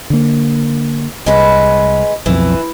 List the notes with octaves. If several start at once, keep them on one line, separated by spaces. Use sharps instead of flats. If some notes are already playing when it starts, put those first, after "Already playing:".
D3 A#3
C2 G#3 B4
B1 F2 E3